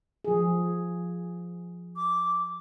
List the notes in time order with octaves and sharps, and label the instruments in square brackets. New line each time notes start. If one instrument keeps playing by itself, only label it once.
[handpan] F3 G#4
[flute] D6